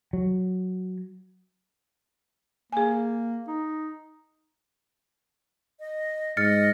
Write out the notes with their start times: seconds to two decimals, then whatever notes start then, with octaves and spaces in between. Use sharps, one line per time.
0.13 F#3
2.73 A#3 G#4 G#5
3.48 D#4
5.80 D#5
6.37 G#2 D#5 F6 A6 C#7